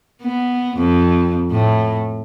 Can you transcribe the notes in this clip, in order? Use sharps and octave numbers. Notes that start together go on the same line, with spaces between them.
B3
F2
A2